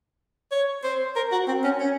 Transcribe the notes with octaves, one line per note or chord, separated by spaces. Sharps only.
C#5
C5
A#4
F#4
C4
C#4
C#4